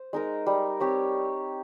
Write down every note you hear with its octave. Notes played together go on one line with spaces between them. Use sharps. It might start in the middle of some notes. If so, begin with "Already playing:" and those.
Already playing: C5
G#3 D#4 A#4
G3
C4 G4 C#5